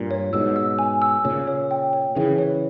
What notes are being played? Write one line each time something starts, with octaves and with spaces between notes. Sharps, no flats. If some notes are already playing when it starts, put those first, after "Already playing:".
Already playing: G2 A#2
C#5
G#2 B2 E6
E6
G#5
E6
A#2 C#3 C#5
C#5
G5
C#5
C#3 E3 G#4
C#5